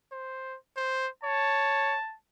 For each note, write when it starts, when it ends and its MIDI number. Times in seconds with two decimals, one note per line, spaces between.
0.12 0.57 72
0.77 1.09 72
1.24 1.97 73
1.24 2.15 81